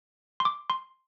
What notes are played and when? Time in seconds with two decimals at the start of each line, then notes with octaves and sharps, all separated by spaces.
0.40 C6
0.45 D6
0.70 C6